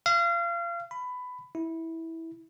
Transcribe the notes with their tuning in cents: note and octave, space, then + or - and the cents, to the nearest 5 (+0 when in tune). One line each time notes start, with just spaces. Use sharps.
F5 -30
B5 +15
E4 -15